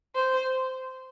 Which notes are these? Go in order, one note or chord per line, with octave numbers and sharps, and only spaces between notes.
C5